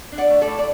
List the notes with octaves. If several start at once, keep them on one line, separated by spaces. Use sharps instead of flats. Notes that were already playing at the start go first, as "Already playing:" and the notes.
D4
D5 F#5
A3
A4 D5
A2
D5